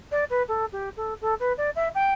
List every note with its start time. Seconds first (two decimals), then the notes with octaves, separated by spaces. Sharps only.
0.11 D5
0.30 B4
0.48 A4
0.72 G4
0.96 A4
1.21 A4
1.40 B4
1.57 D5
1.75 E5
1.95 G5